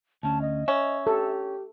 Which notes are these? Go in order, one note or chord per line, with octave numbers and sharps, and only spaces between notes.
D2 C#4 A5
D#5
C#4 E5
G4 A4